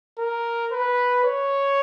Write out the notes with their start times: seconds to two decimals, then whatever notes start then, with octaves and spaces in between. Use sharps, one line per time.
0.19 A#4
0.72 B4
1.24 C#5